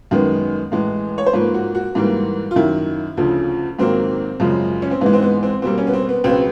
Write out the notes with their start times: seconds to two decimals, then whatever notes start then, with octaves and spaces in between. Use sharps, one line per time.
0.11 F#2 D#3 G#3 B3
0.72 A2 E3 G#3
1.18 C#5
1.26 C5
1.33 G#2 F3 A#3 B4
1.54 F#4
1.75 F#4
1.95 G#2 E3 G3 A#3
2.51 F4
2.56 F#2 D#3 F#3 E4
3.17 D2 C#3 F3
3.79 G#2 D#3 F#3 A#3 C4
4.40 F#2 C#3 F3 G#3
4.82 C#4
4.91 C4
5.01 G#2 E3 G#3 B3
5.13 C4
5.22 B3
5.43 C4
5.62 B2 G3 A#3 C4
5.78 C#4
5.87 B3
5.93 C4
6.09 B3
6.24 C#2 B2 F#3 B3 C4